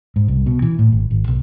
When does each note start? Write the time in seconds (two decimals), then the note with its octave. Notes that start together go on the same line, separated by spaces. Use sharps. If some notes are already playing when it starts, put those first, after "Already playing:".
0.16 G#2
0.28 C2
0.46 B2
0.62 E3
0.79 A2
0.92 G#1
1.10 G#1
1.27 B1